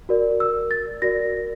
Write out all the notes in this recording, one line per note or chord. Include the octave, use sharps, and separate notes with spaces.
F#4 A#4 D5
E6
A6
F#4 A#4 D5 A#6